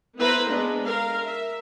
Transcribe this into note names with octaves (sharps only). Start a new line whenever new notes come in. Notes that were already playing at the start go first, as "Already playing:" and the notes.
B3 E4 B4 C5 A#5
G#3 B3 D4
A#4 F5
E5